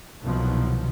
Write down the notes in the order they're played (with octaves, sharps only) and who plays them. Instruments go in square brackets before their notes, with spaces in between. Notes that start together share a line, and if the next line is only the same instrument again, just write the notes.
[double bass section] C2 B2 D#3 F3 F#3